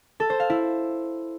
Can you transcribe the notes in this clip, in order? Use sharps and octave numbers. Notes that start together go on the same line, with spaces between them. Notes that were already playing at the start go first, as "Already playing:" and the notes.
A4
C5
F5
E4